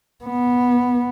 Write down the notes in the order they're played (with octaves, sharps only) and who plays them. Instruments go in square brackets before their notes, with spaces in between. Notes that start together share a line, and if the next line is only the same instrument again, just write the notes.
[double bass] B3